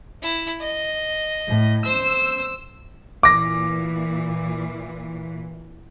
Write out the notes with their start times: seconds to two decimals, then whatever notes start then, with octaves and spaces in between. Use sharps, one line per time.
0.22 E4
0.61 D#5
1.48 A2
1.86 C5 E6
3.23 A#2 E3 D6 A#6